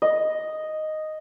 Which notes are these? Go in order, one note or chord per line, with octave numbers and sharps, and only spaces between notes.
D#5